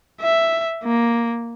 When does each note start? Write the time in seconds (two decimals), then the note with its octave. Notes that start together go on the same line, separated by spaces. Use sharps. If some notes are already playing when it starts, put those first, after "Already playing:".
0.21 E5
0.84 A#3